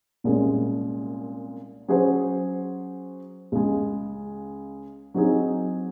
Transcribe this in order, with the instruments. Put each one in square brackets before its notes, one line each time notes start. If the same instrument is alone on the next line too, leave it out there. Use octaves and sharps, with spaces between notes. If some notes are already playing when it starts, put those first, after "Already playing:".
[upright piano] C2 A#2 G#3 C#4
F#3 C#4 G#4 C5
C#2 C#3 G#3
F#3 C4 D#4 G#4